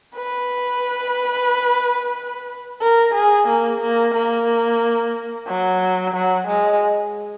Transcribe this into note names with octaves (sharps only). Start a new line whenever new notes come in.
B4
A#4
G#4
A#3
A#3
A#3
F#3
F#3
G#3